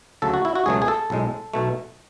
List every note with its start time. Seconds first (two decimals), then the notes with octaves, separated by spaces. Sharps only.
0.22 D2 C#3 F#3 A3 A4
0.34 F#4
0.45 E4
0.55 F#4
0.66 C#2 B2 F#3 A3 G#4
0.82 G#4
0.88 A4
1.10 B1 A2 G#3
1.54 B1 B2 A3